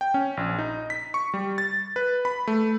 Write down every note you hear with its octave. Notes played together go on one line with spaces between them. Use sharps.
G5
C#4
A#1
D#4
B6
C#6
G3
A6
B4
B5
A3